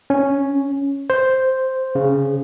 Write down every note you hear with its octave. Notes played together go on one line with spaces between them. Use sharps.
C#4
C5
C#3